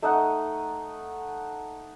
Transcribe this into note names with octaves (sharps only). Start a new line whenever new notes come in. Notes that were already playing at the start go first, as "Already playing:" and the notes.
A3 D#4 D#5 F#5